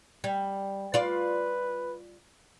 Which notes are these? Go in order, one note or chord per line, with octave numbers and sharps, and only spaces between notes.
G3
F4 B4 D5